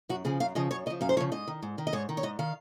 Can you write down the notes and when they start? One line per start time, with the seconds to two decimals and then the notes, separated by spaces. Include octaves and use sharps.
0.09 F#2 F#4
0.25 C#3 F3 G#4
0.40 F#2 F5
0.55 C#3 F3 D#5
0.71 F#2 C#5
0.86 C#3 D#5
0.90 F3
1.01 F#2 F5
1.09 C5
1.17 F3 C#5
1.20 C#3
1.32 G#2 D#5
1.47 D#3
1.62 G#2
1.78 D#3
1.87 D#5
1.93 G#2 C#5
2.09 D#3
2.17 C#5
2.23 G#2 D#5
2.39 D#3 F5